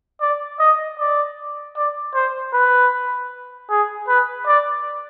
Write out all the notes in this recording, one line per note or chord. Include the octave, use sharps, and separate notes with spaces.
D5
D#5
D5
D5
C5
B4
G#4
B4
D5